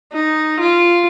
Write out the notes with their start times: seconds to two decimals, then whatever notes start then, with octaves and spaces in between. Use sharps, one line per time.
0.12 D#4
0.60 F4